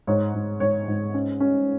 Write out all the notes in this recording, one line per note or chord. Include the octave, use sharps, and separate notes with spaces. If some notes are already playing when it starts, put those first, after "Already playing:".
G#2 C#5
G#2
G#2 C#5
G#2
C#4
C#4